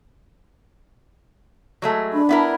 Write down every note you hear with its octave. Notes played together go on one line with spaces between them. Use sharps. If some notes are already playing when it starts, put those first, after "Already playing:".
F#3 G#3 A3
D4 B5
B3 E4 A#4